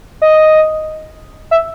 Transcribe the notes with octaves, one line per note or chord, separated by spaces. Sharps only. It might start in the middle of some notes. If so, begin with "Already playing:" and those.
D#5
E5